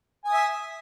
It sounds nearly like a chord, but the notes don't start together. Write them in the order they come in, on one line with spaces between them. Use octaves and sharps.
G#5 D#6 E5